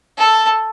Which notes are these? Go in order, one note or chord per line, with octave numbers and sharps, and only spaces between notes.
A4